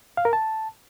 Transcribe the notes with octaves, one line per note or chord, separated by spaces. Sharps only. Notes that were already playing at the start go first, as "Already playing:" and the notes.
F5
A#4
A5